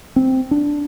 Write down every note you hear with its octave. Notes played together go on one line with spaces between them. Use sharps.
C4
D4